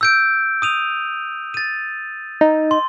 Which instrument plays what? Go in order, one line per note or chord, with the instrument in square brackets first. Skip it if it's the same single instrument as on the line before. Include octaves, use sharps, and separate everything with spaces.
[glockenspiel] E6 G6 D7
D#6 D#7 F7
A6 D#7
[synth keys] D#4
[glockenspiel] C6